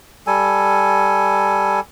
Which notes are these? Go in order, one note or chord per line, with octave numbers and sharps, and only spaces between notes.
G3 A4 G#5